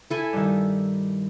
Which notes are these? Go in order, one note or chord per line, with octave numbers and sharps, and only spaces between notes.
E4 A4 G#5
G2 D#3